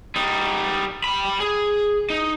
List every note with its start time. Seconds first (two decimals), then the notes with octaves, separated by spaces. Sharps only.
0.16 G3 D#4
1.04 G3 B5
1.40 G#4
2.10 D#4